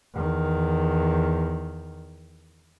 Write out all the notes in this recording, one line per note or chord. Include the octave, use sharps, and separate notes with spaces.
E2 D#3